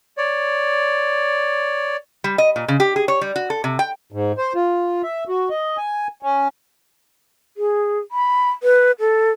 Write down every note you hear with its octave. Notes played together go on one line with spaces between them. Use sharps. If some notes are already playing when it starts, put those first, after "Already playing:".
C#5 D5
G3
D#5
A#2
C#3
G4
G#4
C#5
G3
F#4
A4
C3
G5
G#2
C5
F4
E5
F#4
D#5
G#5
C#4
G#4
B5
B4
A4